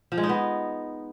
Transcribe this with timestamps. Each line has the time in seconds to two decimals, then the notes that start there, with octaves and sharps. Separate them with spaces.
0.12 F3
0.18 G#3
0.23 D#4
0.29 B3